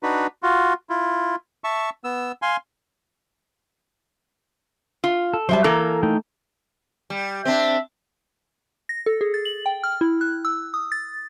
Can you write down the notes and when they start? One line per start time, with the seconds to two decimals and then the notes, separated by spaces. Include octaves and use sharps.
0.03 D4 D#4 F#4 B4
0.43 F4 F#4
0.90 E4 F4
1.64 E5 A5 C#6
2.04 B3 E6
2.42 F5 G#5 C6
5.04 F4
5.34 A4
5.49 F#3 G3 C5 E5 A5
5.64 E3 A#3 A4 A#4 A#5
6.03 A3 D#4 G5
7.10 G3
7.45 C4 D4 E5
8.89 A#6
9.06 A4
9.21 G#4
9.34 A6
9.45 F#7
9.66 G5
9.84 F6
10.01 E4
10.21 F#6
10.45 E6
10.74 D#6
10.92 A6